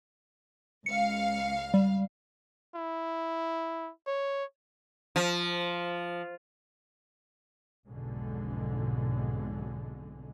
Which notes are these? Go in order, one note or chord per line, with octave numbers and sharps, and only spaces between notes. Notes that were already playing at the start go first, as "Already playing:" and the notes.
C#2 F5 C#7
G3
E4
C#5
F3
B1 F2 G#2 B2 D3 G#3